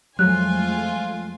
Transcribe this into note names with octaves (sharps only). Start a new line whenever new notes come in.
F2 F#3 G#3 A3 F4 G#5 F#6